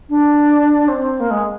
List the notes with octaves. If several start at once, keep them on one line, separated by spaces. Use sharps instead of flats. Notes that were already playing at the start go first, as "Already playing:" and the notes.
D4
C4
A#3
G#3